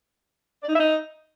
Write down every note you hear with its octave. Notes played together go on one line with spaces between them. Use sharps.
D5
D#4
E5
D#4